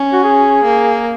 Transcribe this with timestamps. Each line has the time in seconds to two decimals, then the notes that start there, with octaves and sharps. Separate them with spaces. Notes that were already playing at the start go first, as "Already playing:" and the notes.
Already playing: C#4
0.12 F#4
0.24 G#4
0.64 A#3